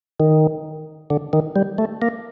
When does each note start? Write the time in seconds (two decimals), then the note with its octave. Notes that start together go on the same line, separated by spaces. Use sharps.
0.20 D#3
1.10 D3
1.33 D#3
1.56 G3
1.78 A3
2.02 A#3